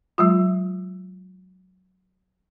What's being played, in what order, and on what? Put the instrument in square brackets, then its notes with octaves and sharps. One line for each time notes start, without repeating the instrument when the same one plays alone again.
[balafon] F#3 G#3 F4